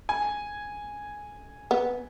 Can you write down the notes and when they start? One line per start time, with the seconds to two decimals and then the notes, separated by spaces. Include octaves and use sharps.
0.09 G#5
1.71 B3